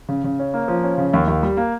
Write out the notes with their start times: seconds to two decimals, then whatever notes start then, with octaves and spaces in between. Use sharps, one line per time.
0.09 C#3
0.24 C#3
0.39 C#4
0.54 A#3
0.68 F3
0.84 C#4
0.98 C#3
1.14 D#2
1.28 D#2
1.43 G3
1.57 A#3